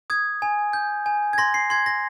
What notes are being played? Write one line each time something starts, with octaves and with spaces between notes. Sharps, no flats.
D#6 G#6
G#5
G6
G#5
G#6
C6 A#6
C7
C6 G#6
A#6